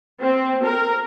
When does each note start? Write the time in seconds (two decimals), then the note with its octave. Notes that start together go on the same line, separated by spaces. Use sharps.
0.21 C4
0.63 A#4